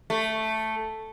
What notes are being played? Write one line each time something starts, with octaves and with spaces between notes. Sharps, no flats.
A3